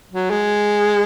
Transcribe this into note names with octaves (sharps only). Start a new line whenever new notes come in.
F#3
G#3